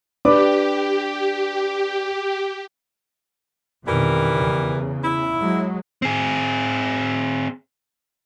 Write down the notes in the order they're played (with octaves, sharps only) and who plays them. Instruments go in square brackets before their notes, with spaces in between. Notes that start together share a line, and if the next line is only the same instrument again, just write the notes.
[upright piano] D4 B4 D6 [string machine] G4
[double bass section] F2 B2 D#3 [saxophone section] E3 G3 A#4
[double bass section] E2 C#3
[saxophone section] E4
[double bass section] F#3 G#3
[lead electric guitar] C4 G#4